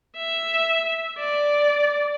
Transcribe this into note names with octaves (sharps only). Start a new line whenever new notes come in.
E5
D5